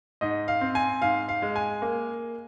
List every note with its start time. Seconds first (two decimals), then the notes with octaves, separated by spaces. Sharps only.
0.21 G#2 D#5
0.48 F5
0.61 C4
0.75 G#5
1.02 G#2 F5
1.29 F5
1.42 G#3
1.56 G#5
1.82 A#3